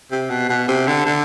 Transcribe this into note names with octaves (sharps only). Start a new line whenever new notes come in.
C3
B2
B2
C3
D3
D3